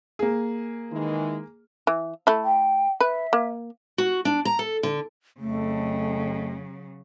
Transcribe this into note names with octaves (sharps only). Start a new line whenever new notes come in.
A#3 G#4
D#3 E3 G#3
E3
A3 E4
G5
B4 E5
A#3
F#4
D4
A#5
A4
D3
F2 C#3 F#3 A3